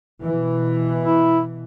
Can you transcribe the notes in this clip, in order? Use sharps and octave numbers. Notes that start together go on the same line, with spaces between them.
B2 E3
E4